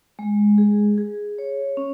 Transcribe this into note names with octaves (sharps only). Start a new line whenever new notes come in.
G#3
G#4
G#4
C#5
C#4